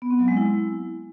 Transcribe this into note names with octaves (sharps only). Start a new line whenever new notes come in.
B3
C4
F#3
G#3
E4